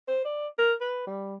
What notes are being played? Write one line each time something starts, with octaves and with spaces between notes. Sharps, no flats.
C5
D5
A#4
B4
G3